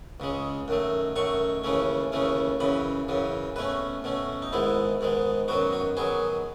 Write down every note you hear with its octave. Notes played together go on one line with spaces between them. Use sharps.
C#2 C#3 G#3
F#2 D#3 A3
F#2 D#3 A3 C#6
D#2 C#3 E3 A3 C#4
D#2 C#3 E3 A3 C#4
F#2 C#3 E3 B5
F#2 C#3 E3
B2 A3 C#4 B4
B2 A3 C#4
D#4
G#2 D#3 G#3 B3 E4
G#2 D#3 G#3 B3
F#2 D#3 F#3 B3 F#4
F#4
D#3 F#3 B3 G#4